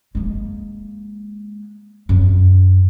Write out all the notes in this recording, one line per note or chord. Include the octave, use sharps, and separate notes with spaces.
G#3 A#3
F#2